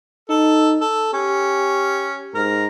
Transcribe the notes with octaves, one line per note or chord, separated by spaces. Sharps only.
D#4 A4
A4
C#4 G4
G#2 A#4